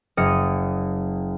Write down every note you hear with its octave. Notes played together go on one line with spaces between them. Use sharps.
F#1 D#5 F6 C#7